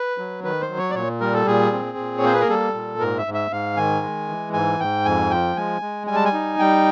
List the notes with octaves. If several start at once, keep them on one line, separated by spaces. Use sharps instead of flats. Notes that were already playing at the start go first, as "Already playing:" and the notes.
Already playing: B4
F#3
D#3 B4
C5
F#3
C#5
D5
A#2 C#5
G3 A#4
A4
A#2 G#4
C4
A#2
C#5
A#3 C5
B4
A#4
G3 A4
A#2
G#2 A#4
E5
G#2
E5
G#2 F5
D#3 G#5
G#3
E3
G#2 G#5
G#2 G5
F2 G#5
F3 G5
G#3 G#5
G#3
G3 G#5
A5
G#5
D#4
G3 G5